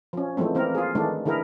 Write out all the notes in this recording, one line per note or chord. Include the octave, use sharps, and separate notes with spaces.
F3 C#4
E3 F3 G#3 A3 C4
E3 A#3 C4 A#4
F4 G#4
D#3 E3 G#3 A3 D4
D3 E3 E4 G#4 A#4